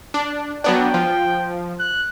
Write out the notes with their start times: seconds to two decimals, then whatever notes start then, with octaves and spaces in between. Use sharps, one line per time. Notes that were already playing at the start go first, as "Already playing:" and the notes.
0.14 D4
0.64 F#3 B3 D4 G5
0.94 F3
1.79 F#6